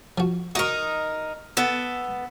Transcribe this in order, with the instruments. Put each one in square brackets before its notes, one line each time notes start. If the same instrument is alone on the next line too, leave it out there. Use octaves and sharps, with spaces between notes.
[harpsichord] F3 F#4
[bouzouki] D#4 A#4 [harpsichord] F#4 F#5 C#6
[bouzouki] B3 A4